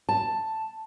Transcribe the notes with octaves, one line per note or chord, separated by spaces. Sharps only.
A5